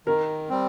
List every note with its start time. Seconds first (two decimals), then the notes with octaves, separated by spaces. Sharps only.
0.07 D#3 A#4
0.49 G3 C4